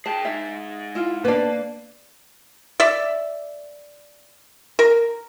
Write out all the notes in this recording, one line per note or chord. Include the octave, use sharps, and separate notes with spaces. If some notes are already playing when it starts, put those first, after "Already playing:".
G#4 G5 A5
G#3 D#4 E5
E4 F4
A#3 B3 D4 B4 D5
D5 E5
A#4